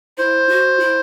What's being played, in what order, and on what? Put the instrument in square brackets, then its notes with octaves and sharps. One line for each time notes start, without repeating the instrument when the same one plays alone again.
[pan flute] E4 [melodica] C5
[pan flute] F#4
E4